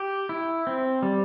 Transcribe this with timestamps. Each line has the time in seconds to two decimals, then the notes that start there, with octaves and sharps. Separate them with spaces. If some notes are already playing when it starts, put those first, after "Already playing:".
Already playing: G4
0.29 E4
0.67 C4
1.03 G3